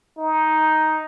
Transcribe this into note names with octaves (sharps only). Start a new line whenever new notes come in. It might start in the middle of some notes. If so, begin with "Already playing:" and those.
D#4